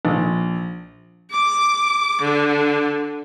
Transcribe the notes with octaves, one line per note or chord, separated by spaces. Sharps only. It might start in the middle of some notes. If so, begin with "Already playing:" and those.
A#1
D6
D3